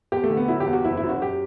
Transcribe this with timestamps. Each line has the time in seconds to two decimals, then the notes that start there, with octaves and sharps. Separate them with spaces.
0.12 E2 G4
0.24 A3
0.30 D3
0.37 B3
0.48 F#3 E4
0.60 G4
0.67 E2
0.73 F#4
0.84 F#1 E4
0.97 E4
1.03 F#2
1.09 F#4
1.21 F#2 G4